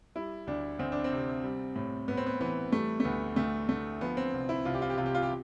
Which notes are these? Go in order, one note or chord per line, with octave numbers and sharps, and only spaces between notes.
G3 E4
D2 D4
D2 C4
D4
C4
C3
G3
A2
A2 B3
C4
B3
E3 B3
G3 A3
A3
D2 B3
D2 A3
D3 A3
F3 B3
C4
C2
E4
C2 F4
G4
F4
G4
C3 F4
G4
F4
G4